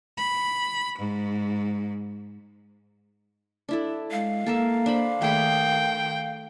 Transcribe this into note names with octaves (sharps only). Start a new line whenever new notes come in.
B5
G#2
D4 E4 A4
G#3 F5
A#3 A4 A#4 E5
D4 C5 B5
D#3 A3 G#4 G5 B5